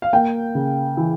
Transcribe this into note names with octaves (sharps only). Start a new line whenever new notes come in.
F5
A#3 G5
C#3
E3